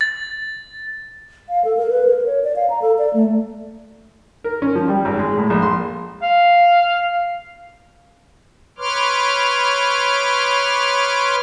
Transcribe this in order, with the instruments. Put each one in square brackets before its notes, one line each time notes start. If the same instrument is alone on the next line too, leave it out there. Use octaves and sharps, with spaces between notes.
[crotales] A6
[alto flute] F5
A4
A#4
B4
A#4
C#5
D5
F5
A#5
A4
D5
A3
[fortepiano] A#4
C#4
F3
G3
G#1
G#3
A2
A#1
C6
[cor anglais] F5
[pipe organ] B4 C#5 C6 D6 F6